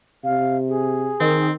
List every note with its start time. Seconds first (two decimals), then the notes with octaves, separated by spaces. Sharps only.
0.24 C3 F5
0.69 G#4
1.20 D#3 C4